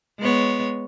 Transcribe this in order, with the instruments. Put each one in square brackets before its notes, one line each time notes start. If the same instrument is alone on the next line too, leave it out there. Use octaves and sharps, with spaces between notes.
[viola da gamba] G#3 B3 C#5